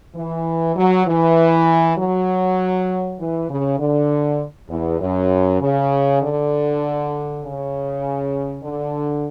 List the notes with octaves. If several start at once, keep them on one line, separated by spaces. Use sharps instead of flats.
E3
F#3
E3
F#3
E3
C#3
D3
E2
F#2
C#3
D3
C#3
D3